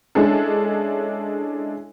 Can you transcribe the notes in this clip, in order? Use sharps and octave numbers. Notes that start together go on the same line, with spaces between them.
G#3 C#4 D4 E4 G#4 A4